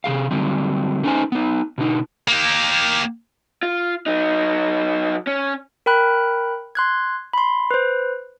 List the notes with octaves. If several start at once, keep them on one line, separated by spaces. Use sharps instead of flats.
C3 G#3 G#4 F5
D3 F#3 G3 C4
A3 C#4 D#4 G4 C5 G#5
B3 D#4
B2 D3 D#4
A#3 G4
F4
F#3 D#4
C#4
A#4 G5 B5 F#6
C6 F#6 G#6
B5 C6
B4 C5